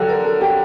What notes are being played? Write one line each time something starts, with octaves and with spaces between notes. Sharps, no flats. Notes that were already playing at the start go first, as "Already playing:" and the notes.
Already playing: D3 F#3 G4 A4
A#4
A4
G4